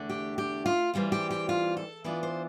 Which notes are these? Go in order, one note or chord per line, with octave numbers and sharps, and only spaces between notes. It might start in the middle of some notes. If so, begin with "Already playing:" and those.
Already playing: E2 D3 A3 D4
G4
G4
F4
E3 G3 C4 F4
G4
G4
F4
A4
E3 B3 D4 F4 B4
C5